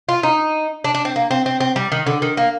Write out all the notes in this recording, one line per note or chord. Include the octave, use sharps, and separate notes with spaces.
F4
D#4
D4
D4
C4
A#3
C4
C4
C4
G3
D#3
D3
D#3
A#3